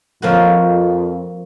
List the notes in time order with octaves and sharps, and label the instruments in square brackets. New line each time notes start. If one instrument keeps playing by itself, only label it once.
[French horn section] F2 [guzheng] F3 A#3 F#4